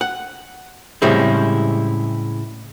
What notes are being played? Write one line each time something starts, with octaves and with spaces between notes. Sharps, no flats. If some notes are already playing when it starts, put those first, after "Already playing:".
F#5
A2 C#3 G3 G#3 C4 E4